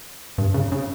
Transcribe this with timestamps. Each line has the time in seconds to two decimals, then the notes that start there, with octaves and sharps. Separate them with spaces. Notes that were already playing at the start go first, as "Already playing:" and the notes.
0.38 G2
0.54 C#3
0.72 C#3